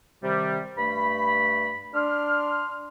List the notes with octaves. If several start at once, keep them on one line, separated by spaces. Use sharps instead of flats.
C3 D#3 G3
G2 A3 B5
D4 C6 F6